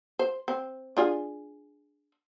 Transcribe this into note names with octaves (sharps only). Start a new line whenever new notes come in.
C5
C4
D4 F4 G#4